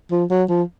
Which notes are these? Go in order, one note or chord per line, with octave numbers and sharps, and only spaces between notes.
F3
F#3
F3